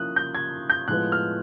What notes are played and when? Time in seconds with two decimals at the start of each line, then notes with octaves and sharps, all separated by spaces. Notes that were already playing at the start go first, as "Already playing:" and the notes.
Already playing: F3 A#3 C#4 E4 D#6 F#6
0.16 G6
0.35 G#6
0.70 G6
0.88 A2 F3 G#3 B3 F#6
1.12 F6